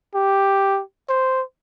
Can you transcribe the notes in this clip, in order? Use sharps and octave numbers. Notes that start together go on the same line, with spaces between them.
G4
C5